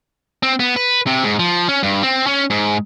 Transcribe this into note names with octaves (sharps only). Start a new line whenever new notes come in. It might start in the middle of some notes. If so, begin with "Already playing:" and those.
C4
B3
B4
C3
G#2
F3
C#4
G2
C4
C#4
G#2